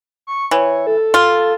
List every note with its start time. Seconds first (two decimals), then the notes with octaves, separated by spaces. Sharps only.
0.27 C#6
0.51 E3 C#5
0.87 A4
1.14 F4